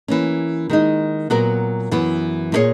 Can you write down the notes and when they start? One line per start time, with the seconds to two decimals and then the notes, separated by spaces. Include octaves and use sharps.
0.08 E3 A#3 C#4
0.70 D#3 G#3 D#4
1.30 A#2 F#3 B3 F#4 A#4
1.91 F#2 E3 B3
2.52 A#2 A#3 E4 G#4 C#5